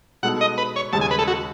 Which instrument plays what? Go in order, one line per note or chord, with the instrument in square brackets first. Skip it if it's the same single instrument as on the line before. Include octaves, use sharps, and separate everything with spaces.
[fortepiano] B2 G#3 D#4 A4 [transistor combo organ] F#5
[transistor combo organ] D#5
B4
C#5
[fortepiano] D#2 C#3 G#3 [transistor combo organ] A5
[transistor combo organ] G#5
B4
A4
F#4